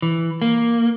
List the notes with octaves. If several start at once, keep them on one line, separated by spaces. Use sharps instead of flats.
E3
A#3